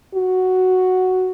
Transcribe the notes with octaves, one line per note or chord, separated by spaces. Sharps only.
F#4